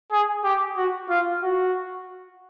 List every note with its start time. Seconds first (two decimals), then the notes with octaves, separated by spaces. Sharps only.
0.12 G#4
0.44 G4
0.77 F#4
1.10 F4
1.42 F#4